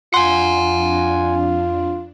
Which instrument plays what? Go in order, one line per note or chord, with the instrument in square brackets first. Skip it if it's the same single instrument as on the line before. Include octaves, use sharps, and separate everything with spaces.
[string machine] F2 D4 [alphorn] F4 [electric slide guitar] F#5 G#5 [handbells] C6